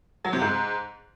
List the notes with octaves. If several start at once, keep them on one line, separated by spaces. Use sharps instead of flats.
F#3
C3
G#2